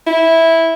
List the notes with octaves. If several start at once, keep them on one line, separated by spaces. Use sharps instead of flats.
E4